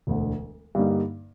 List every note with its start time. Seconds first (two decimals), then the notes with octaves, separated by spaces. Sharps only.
0.07 E1 D2 D3
0.75 G2 D3 G3 A#3 D#4